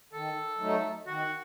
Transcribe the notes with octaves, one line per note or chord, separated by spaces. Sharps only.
D#3 A4
F#3 A3 D#4
D#3 F#4